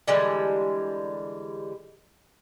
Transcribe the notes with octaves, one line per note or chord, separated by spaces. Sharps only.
D3 E3 G3 G#3